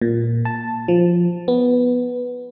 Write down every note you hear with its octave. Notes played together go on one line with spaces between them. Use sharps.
A#2
A5
F3
B3